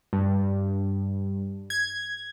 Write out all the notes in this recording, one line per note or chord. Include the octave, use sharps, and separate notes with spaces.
G2
G#6